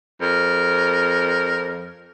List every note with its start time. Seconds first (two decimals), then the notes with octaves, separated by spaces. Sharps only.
0.21 F2 A#4